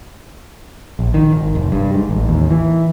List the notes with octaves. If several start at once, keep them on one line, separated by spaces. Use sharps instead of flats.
A#1
D#3
G#1
F1
G2
G#2
A1
D#2
E3